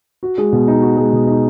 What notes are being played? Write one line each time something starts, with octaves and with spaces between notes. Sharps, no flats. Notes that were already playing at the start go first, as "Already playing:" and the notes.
F#4
G#3
B2
D#4
F#4
G#3
B2
D#4